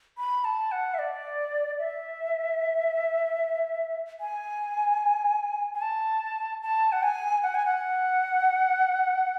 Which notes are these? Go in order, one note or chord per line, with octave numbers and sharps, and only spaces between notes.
B5
A5
F#5
E5
D5
E5
G#5
G#5
A5
A5
F#5
G#5
F#5
G#5
F#5